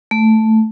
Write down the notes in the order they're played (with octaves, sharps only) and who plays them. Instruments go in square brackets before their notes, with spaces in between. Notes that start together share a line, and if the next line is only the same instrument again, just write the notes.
[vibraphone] A3